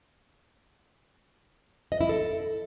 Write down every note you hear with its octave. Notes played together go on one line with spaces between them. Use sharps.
D#5
E4
A4